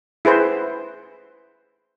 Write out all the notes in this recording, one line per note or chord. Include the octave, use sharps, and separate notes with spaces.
E4 G#4 B4 C5